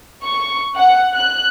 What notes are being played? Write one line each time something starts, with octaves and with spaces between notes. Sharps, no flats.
C#6
F#5
F#6